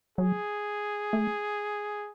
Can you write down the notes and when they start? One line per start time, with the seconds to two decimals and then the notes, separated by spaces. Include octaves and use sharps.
0.18 F#3 G#4
1.13 A3